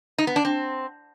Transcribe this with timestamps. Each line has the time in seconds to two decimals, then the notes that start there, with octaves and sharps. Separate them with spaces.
0.18 D#4
0.27 B3
0.36 D4
0.45 C4